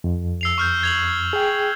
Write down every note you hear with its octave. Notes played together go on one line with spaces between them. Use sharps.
F2
E6 C7 F7
C#6 F6 G6
G#6 F7 F#7
G#4 G5